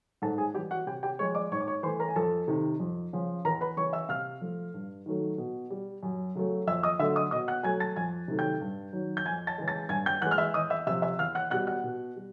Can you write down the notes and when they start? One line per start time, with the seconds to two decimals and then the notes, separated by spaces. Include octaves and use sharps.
0.22 G#2 A4 A5
0.38 G#4 G#5
0.54 G3 G4 G5
0.58 E3
0.71 F#4 F#5
0.87 C3 G4 G5
1.03 G4 G5
1.19 F3 G#3 C#5 C#6
1.35 D5 D6
1.52 G#2 C#5 C#6
1.60 D6
1.67 C#5 C#6
1.83 E3 A3 C5 C6
1.99 A#4 A#5
2.08 G#5
2.16 F2 A4 A5
2.48 C3 D#3
2.80 F2
3.13 C#3 F3
3.45 E2 A#4 A#5
3.61 B4 B5
3.77 C#3 E3 C#5 C#6
3.93 E5 E6
4.09 C3 F5 F6
4.41 F3 A3
4.74 G2
5.06 D#3 F#3 A3
5.38 B2
5.71 G3
6.03 F#2
6.35 C#3 F#3 A3
6.67 F2 E5 E6
6.83 D#5 D#6
6.99 D3 F#3 A3 E5 E6
7.16 D#5 D#6
7.31 B2 D#5 D#6
7.48 F#5 F#6
7.63 F#3 A3 G#5 G#6
7.80 A5 A6
7.96 F2 G#5 G#6
8.28 C3 D#3 F#3 A3
8.39 G5 G6
8.61 G2
8.93 D#3 F#3
9.17 G6
9.25 F2 G#5 G#6
9.47 A5 A6
9.58 C#3 E3 G#3
9.68 A5 A6
9.89 G2 G#5 G#6
10.06 G5 G6
10.21 E3 G#3 F#5 F#6
10.31 F6
10.38 E5 E6
10.54 E2 D#5 D#6
10.70 E5 E6
10.87 C3 E5 E6
10.90 F3
11.02 E5 E6
11.18 E2 F5 F6
11.35 F#5 F#6
11.50 B2 G3 F#5 F#6
11.67 F#5 F#6
11.84 B2
12.16 G3